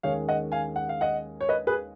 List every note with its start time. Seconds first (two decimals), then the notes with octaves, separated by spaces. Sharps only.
0.03 D#2 D#3 G#3 C#4 C#5 F5
0.28 D#5 F#5
0.52 F5 G#5
0.76 F#5
0.89 F5
1.01 D#5 F#5
1.41 C#5
1.49 B4 D#5
1.67 G#4 B4